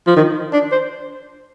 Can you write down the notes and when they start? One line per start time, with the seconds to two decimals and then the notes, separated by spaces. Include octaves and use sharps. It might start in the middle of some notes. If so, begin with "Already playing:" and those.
0.07 F3
0.17 D#3
0.53 D4
0.72 C5